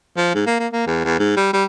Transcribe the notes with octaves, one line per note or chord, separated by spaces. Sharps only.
F3
G#2
A#3
A#3
A#3
E2
E2
G#2
G3
G3